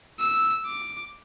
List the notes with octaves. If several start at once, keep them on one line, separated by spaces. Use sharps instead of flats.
E6
D6